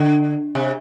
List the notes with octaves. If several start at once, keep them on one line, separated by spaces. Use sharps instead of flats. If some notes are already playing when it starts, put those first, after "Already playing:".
Already playing: D3
C3